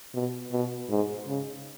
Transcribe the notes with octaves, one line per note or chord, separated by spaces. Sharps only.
B2
B2
G#2
C#3